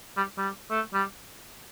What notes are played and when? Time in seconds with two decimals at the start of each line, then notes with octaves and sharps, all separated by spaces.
0.17 G3
0.38 G3
0.70 A3
0.94 G3